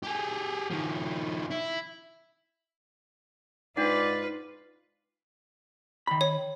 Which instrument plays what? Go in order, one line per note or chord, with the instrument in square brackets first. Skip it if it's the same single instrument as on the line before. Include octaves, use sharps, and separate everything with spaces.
[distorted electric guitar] G4 G#4
D#3 F3
E4
[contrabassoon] G#2 [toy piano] D4 F#5 [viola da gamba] F4 B4 [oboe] D5
[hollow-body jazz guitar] D#3 B5
[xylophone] C#5